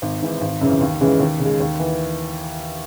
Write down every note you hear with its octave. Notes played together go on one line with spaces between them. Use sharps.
G#1
G#2 E3
G#1
F#2 C#3 E3
D#2
C#3 E3 G#3 C#4
D#2
C#3
G#3
D#2
E3